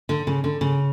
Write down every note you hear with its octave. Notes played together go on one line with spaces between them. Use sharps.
D3
C#3
D3
C#3